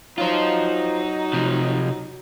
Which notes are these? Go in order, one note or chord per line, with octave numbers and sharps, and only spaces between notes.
F#3 D#4 F4 C5
C3 F3